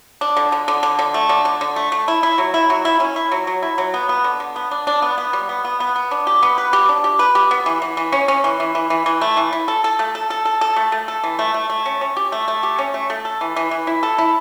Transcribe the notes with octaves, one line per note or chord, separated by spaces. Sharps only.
D4
D3
D3
D3
D3
D3
A3
D3
D3
D3
A3
A3
E4
E4
F#3
E4
F#3
E4
C#4
E4
F#3
F#3
E4
F#3
B3
B3
D3
D3
B3
D4
D4
B3
B3
G3
B3
B3
B3
B3
D4
G4
B3
B4
G4
D4
G4
B4
G4
B3
E3
E3
E3
C#4
C#4
E3
E3
E3
E3
E3
A3
E3
E4
A4
A4
A3
A4
A4
A4
A4
A3
A3
A4
E3
A3
A3
A3
C#4
C#4
G4
A3
A3
G4
C#4
A3
A3
A4
E3
E3
E3
E4
A4
E4